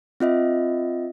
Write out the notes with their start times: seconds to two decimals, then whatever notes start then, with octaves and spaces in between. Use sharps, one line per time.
0.20 C4 F4 D#5 E5